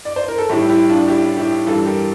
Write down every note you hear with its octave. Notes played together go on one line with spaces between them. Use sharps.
D5
C5
A#4
A4
A2 G3 E4 G4
E4 G4
D4 F4
E4 G4
E4 G4
G2 E3 G3 F4 A4
G4 A#4